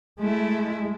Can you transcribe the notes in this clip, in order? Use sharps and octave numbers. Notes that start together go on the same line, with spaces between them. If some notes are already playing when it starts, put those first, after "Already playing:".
G#3 A3 E4